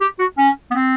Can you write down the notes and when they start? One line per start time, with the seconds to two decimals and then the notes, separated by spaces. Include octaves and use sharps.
0.01 G4
0.19 F#4
0.38 C#4
0.71 B3
0.75 C4